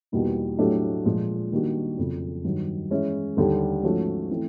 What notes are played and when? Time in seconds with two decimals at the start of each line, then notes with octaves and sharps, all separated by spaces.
0.12 E2 B2 G3 A#3 D#4
0.59 A2 F#3 A3 D4 G4
1.05 A#2 F3 G#3
1.52 D#3 G3 A#3 D4 F#4
1.98 F2 C#3 F#3
2.44 G2 D#3 F#3
2.90 E3 G#3 C#4 E4 G#4
3.37 D#2 D3 G3
3.83 G#2 F3 A3 C#4 F#4
4.30 E3 A3 C4 E4